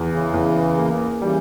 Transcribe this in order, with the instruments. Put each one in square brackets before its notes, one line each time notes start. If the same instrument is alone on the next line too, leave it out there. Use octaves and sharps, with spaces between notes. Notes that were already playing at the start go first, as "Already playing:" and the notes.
Already playing: [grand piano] E2
[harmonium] C#3 E3
[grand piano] E2
A#3
[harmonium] C#3 E3 [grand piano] G3